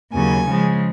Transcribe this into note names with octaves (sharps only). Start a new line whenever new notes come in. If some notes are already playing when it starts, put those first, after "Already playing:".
D#2 C#3 F#3 G#5
C#3 F3 G#3